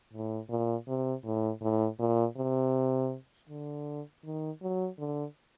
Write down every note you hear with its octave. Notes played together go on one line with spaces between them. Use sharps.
A2
A#2
C3
A2
A2
A#2
C3
D3
D#3
F#3
D3